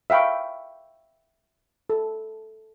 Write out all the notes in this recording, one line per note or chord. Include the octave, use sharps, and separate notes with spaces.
E5 F5 G5 B5 C#6
A4